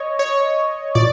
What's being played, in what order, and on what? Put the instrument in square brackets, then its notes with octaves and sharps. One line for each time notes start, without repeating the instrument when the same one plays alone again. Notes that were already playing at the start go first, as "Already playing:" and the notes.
Already playing: [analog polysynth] C#5 D#5
C#5
[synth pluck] A#2 [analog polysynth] D5